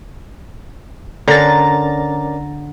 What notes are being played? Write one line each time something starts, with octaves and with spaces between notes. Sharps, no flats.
D3 C#4 A#4 D5 A#5 A6